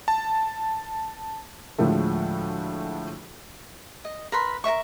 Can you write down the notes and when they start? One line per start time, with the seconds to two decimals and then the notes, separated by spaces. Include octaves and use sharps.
0.08 A5
1.79 D2 A2 F3 G#3 A3
4.05 D#5
4.32 A#4 B4 B5 C6
4.64 A#4 D#5 E5 C#6